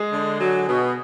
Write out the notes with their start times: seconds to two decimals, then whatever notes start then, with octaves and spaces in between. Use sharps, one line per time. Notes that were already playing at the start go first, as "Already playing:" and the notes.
Already playing: G#3 G#4
0.13 D3
0.40 F#3
0.68 B2